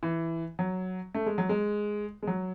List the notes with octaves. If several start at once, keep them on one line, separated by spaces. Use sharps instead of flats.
E3
F#3
A3
G#3
F#3
G#3
G#3
F#3